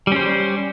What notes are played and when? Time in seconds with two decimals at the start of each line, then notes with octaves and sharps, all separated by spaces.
0.07 G3
0.12 C#4
0.16 C5